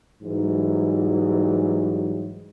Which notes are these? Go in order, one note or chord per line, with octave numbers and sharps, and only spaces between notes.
G#2 E3 F#3 G3